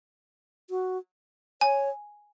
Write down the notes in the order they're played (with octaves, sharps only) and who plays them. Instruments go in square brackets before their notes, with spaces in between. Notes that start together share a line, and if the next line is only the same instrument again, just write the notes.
[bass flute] F#4
[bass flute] C#5 [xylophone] G#5